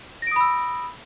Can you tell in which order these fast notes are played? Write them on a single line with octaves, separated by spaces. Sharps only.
A#6 D7 D#6 B5 E6